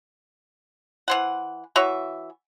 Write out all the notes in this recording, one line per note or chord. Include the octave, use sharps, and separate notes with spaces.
E3 C5 F#5
E3 F#4 C#5 E5